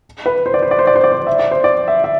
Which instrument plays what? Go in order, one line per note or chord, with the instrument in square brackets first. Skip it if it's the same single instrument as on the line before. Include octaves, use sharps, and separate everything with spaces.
[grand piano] B4
C5
D5
C5
D5
C5
D5
C5
D5
C5
E5
D5
C5
D5
E5
E5